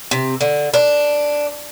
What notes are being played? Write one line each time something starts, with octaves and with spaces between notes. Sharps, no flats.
C3
D3
D4